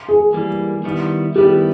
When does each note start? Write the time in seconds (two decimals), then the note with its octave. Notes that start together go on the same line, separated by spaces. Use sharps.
0.09 G#4
0.33 E3 G3 A#3
0.84 D#3 G3 B3 E4
1.35 D#3 G3 B3 E4 G4